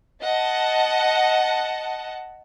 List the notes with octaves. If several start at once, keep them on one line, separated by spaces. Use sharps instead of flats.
D#5 F#5 A5